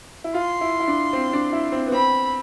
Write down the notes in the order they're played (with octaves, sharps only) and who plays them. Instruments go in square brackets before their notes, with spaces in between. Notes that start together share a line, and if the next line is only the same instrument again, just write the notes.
[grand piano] E4
[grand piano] F4 [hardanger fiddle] C6
[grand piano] E4
E4
D4
C4
D4
E4
C4
B3
[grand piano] C4 [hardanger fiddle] B5